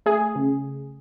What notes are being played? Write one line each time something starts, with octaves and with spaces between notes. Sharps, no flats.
A3 G#4
C#3